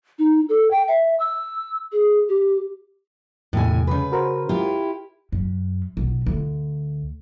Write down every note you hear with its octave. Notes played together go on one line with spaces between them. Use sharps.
D#4
A4
G5
E5
E6
G#4
G4
E2 A2 C3 G#5
C#3 B4
F#4 A#4 C5
E4 F4 G4
F#2
B1
D2